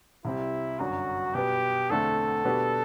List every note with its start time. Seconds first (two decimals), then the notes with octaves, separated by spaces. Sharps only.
0.25 C2 C3 G3 C4 E4
0.79 G1 F#2 D3 F#3 F#4
1.34 B2 G3 B3 G4
1.90 E2 D3 A3 C4 A4
2.45 B2 G3 B3 D4 F#4